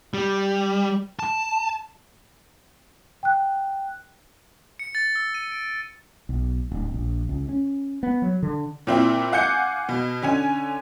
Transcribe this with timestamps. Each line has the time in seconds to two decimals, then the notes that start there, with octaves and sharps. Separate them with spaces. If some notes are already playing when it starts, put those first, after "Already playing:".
0.14 G3
1.19 A5
3.23 G5 F#6
4.79 C#7
4.95 A6
5.16 E6
5.35 D#7
5.52 D7
6.29 B1
6.71 D1
6.94 A#1
7.29 C#2
7.49 C#4
8.03 B3
8.22 F#3
8.43 D3
8.87 A#2 C4 E4
9.32 F5 F#5 G#5 D6 G6 C#7
9.89 B2
10.22 D3 C#4 G#5